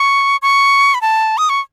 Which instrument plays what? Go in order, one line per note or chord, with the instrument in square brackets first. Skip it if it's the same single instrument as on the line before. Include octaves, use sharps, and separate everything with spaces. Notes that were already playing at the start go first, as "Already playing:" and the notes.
Already playing: [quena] C#6
C#6
B5
A5
D#6
C#6